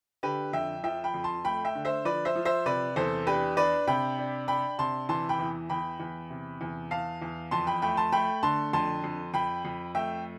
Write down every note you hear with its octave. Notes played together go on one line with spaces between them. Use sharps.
D3 G4 B4
F2 E5 G5
F3 E5 G5
G5 B5
F2
A5 C6
A3 G5 B5
E5 G5
D3
C5 E5
F3 B4 D5
C5 E5
F3
C5 E5
C3 B4 D5
E2 A4 C5
D4 G4 B4
D4 B4 D5
C3 G5 B5
D4
D4 G5 B5
C3 A5 C6
E3 A5 C6
G5 B5
E2
E2 G5 B5
E2
C3
E2
E2 F5 A5
E2
F2 A5 C6
G5 B5
A3 G5 B5
A5 C6
A3 G5 B5
D3 A5 C6
F2 A5 C6
F2
F2 G5 B5
F2
A3 E5 G5